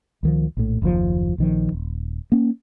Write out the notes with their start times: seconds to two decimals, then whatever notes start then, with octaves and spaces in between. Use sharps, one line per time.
0.23 C#2 D#3 F3
0.57 A#1 A2
0.82 F#1 D#2 C#3 F3
1.38 A#1 D#3 F3
1.72 D#1
2.32 A#3 C#4